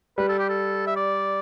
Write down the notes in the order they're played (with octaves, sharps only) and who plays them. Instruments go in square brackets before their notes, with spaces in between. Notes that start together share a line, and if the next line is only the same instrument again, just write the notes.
[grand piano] G3 [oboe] B4
[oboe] A4
G4
A4
E5
D5